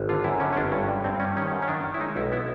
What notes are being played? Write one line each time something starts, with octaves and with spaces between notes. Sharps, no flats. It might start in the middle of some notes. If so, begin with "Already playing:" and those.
Already playing: G#1
D3 F4
F#2 E4
D3 C#4
C#4
G1 D4
G2 C#4
G2
G2 C4
G3 C#4
D#3 C#4
F#2
C#4
D#3 D4
D#3
E4
G#3 D#4
B1 E4
B3 E4